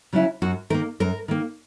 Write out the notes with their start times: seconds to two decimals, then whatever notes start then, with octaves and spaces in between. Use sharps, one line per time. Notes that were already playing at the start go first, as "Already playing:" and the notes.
0.13 C#3 F#3 C#4 E4
0.42 F#2 F#4
0.70 D#3 A#4
0.74 A#3
1.00 F#2 A#4
1.28 D#3 A#3